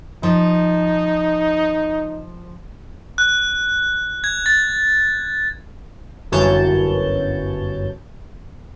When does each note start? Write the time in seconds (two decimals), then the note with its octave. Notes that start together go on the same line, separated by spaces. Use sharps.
0.23 F3 D#4
3.18 F#6
4.24 G#6
4.46 A6
6.32 G1 F#2 E3 C#5 A5 G6